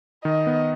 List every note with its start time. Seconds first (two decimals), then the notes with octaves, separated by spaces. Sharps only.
0.25 D#3 D#5
0.47 B3